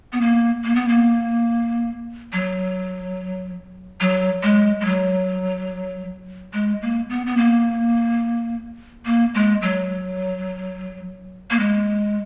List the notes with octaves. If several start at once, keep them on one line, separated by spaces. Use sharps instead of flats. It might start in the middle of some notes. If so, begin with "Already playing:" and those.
B3
A#3
A#3
B3
A#3
F#3
F#3
G#3
G#3
F#3
G#3
A#3
B3
B3
A#3
A#3
G#3
F#3
A#3
G#3